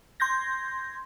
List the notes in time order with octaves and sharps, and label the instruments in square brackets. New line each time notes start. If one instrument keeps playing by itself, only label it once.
[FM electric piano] C6 G6 G#6 A#6